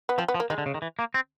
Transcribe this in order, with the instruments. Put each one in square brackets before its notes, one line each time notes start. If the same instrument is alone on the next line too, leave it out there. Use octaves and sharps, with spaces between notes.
[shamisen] B3
[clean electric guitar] F3 [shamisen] C4
[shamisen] B3
[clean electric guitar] F3
[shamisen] A#3
[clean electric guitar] D#3 [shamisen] G#3
[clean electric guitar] D3
C#3
D#3
E3
A#3
C4